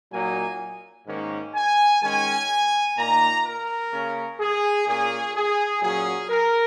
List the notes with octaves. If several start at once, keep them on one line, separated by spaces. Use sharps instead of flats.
A#2 F#3 A#3 D#4 G#5
G#2 D#3 A#3 C#4
G#5
D#3 G#3 C#4 G#5
A#2 A#3 D#4 A#5
A#4
C#3 A#3 C#4
G#4
A#2 A#3 C#4 G#4
G#4
A#2 F#3 C#4 G#4
A#4